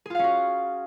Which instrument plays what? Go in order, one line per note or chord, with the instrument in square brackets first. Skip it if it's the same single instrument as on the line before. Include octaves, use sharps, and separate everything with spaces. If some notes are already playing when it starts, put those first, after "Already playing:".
[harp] G#4
F4
F5
C#4
F#4